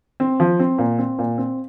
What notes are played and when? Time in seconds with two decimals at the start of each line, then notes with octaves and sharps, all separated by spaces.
0.20 C4
0.40 F3
0.60 C4
0.78 A#2
0.98 C4
1.19 A#2
1.38 C4